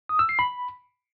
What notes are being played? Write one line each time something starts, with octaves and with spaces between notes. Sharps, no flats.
D#6
E6
C7
B5